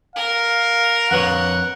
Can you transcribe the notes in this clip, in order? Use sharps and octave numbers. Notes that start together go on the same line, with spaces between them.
A#4 F5
F2 B4 C#5 F#5